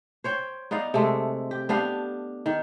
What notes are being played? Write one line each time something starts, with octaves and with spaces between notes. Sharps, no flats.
C5 C#5 G5
B3 D#4 D5 F5
C3 G#3 A3
G4
B3 D4 G4 F5
D#3